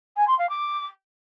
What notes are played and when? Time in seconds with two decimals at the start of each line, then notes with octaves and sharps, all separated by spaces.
0.16 G#5
0.27 C6
0.38 F5
0.49 D6